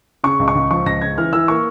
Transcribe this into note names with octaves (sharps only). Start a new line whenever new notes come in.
C#3 C#6
C#2
C#6
C#2
F3 C#6
C#2 A#6
C#3 G#6
E3 F6
E3 E6
A#3 C#6